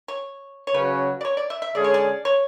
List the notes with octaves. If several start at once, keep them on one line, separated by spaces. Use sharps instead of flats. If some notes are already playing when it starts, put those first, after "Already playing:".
C#5
C#5
C#3 F#3 C#4 F#4 B4
D5
C#5
D5
E5
E5
D3 G#3 C#4 G#4 D5
C#5
D5
C#5